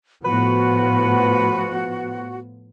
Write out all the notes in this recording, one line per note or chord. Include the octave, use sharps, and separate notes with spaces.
A2 F3 B3 F#4 B4